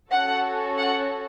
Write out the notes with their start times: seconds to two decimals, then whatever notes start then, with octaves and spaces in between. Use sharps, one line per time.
0.12 C#4 F#4 A4 F#5
0.79 F#5